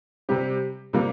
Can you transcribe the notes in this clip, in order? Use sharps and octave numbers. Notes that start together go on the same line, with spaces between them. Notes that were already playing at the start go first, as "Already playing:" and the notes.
C3 G3 C4 G4
C3 G3 A#3